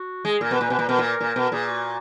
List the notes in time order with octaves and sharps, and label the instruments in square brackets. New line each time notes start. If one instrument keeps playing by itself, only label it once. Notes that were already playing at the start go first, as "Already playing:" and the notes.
Already playing: [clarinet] F#4
[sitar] G#3 [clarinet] G#4
[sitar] A#2 [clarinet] A#4
[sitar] B2
[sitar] A#2 [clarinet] B4
[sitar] B2 [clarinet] B4
[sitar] A#2
[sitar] B2 [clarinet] A#4
[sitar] A#2
A#2
B2
[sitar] A#2 [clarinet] G#4
[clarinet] F#4